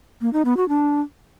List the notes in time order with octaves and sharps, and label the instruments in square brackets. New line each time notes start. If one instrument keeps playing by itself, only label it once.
[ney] A#3
D#4
B3
F#4
D4